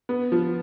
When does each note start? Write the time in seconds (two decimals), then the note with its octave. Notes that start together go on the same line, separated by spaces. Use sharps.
0.09 B3
0.32 F3